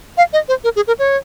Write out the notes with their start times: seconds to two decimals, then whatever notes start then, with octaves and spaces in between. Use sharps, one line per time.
0.18 F5
0.33 D#5
0.49 C5
0.64 A#4
0.76 G#4
0.87 A#4
0.99 C#5